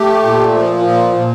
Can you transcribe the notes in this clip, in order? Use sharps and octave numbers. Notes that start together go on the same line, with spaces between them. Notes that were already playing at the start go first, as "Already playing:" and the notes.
Already playing: A3 G4
A#2
F3
A#2
A#2